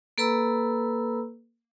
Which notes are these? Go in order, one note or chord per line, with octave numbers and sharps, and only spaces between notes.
A#3 A4 B4 A#5 B5 E6